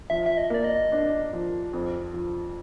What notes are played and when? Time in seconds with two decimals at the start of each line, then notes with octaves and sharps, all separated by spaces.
0.10 F3 E5
0.26 E5
0.38 D#5
0.50 A#3 D5
0.64 D#5
0.92 D4
1.33 F3
1.73 F2
2.14 F3